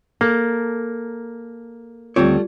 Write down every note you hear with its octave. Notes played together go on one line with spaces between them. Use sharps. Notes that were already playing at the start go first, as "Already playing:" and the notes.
A#3 A4 A#4
D2 G3 A3 C4 F4 C#5